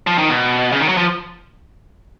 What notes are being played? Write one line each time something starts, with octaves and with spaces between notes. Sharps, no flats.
F3
D#3
B2
C#3
D#3
F#3
F3